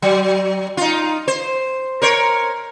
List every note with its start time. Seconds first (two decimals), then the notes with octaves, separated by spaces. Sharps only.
0.02 F#3
0.77 D#4 F4
1.28 C5
2.02 A#4 C5 C#5